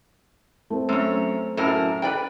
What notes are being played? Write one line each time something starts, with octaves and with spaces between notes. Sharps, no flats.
A3 C4
F#2 C#5
F#2 A2 A#4
B4 D5 G5